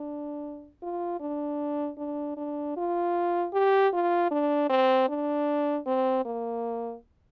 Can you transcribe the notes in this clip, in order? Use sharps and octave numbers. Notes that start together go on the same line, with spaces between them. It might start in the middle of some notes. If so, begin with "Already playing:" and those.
Already playing: D4
F4
D4
D4
D4
F4
G4
F4
D4
C4
D4
C4
A#3